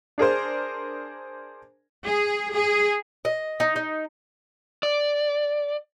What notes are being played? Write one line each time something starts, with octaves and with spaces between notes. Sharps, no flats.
D4 G#4 A#4 C5
G#4
G#4
D#5
D#4
D#4
D5